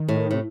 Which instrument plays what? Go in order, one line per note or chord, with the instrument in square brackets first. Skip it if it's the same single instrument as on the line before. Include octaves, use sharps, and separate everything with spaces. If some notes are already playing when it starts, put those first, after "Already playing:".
Already playing: [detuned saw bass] D#3
[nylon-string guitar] A2
[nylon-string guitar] A2 [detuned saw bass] C3